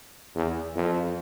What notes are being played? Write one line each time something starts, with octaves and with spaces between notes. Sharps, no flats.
E2
F2